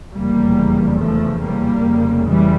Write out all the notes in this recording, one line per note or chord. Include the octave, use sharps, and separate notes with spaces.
F1 E2 C#3 G3 A#3
F3 A3
G3 A#3
F1 F2 C#3
E3 G3